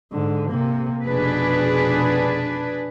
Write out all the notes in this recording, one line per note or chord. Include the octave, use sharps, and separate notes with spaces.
G#2 D3
C3 A#3
F1 B2 D4 G#4 B4